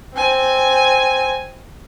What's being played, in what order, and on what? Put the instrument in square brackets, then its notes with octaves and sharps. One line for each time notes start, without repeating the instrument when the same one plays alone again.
[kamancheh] C4 G#5